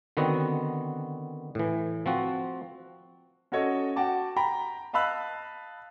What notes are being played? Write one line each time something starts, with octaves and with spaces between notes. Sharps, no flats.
D3 D#3 B3 C4 F#4
A2 E3
F3 C4 F#4
C#4 F#4 A4 C#5 D#5
F#4 F#5 G5 A5 D6
G5 A#5 B5
D#5 F5 A5 B5 E6 F#6